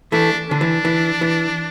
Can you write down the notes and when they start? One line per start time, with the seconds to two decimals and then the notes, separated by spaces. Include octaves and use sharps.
0.12 E3 A3 D4
0.49 D3 D4
0.61 E3
0.85 E3
1.21 E3